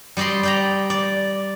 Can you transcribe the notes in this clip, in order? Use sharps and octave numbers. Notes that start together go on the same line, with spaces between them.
G3 G4 D5 D#5 C6
D5 G5 A#5
D5